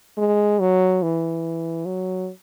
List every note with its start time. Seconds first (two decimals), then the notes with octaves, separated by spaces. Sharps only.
0.18 G#3
0.60 F#3
1.02 E3
1.85 F#3